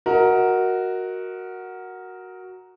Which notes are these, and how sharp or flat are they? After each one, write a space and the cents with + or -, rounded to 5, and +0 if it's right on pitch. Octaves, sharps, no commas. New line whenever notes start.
F#4 +0 A#4 +0 D#5 +35